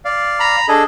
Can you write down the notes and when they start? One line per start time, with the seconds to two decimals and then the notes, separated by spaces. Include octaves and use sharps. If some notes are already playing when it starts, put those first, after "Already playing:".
0.05 D5 F5
0.40 A#5 B5
0.68 D4 G#4 A4 D#5